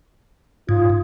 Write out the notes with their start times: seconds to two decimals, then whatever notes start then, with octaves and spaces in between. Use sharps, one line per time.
0.69 G#2 F4